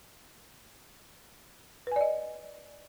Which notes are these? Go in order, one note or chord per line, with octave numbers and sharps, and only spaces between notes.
B4 D5 D#5 G#5